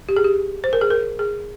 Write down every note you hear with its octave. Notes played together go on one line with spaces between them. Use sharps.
G4
G#4
G4
C5
A#4
G#4
A#4
G#4